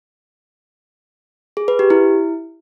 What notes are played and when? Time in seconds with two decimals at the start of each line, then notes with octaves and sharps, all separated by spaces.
1.57 G#4
1.68 B4
1.79 G4
1.90 E4